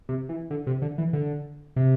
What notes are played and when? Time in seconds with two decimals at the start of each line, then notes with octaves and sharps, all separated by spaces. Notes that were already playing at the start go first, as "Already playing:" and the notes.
0.09 C3
0.29 E3
0.50 D3
0.67 C3
0.82 D3
0.98 E3
1.13 D3
1.76 C3